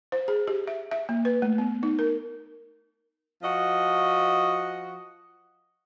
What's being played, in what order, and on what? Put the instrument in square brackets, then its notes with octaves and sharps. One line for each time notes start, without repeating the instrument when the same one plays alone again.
[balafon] C5
G#4
G4
E5
E5
A#3
B4
A3
B3
D#4
A#4
[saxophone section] F3 F#4 D#5